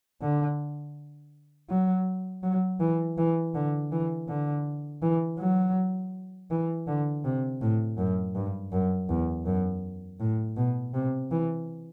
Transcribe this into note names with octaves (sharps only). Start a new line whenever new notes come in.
D3
F#3
F#3
E3
E3
D3
E3
D3
E3
F#3
E3
D3
C3
A2
F#2
G2
F#2
E2
F#2
A2
B2
C3
E3